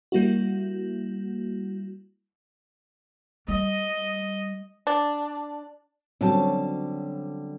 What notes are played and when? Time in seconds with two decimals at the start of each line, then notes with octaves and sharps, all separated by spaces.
0.12 G3 A#3 E4 F#4
3.48 G3 D#5
4.87 D4
6.21 D3 F#3 G3 C4 C#4 A5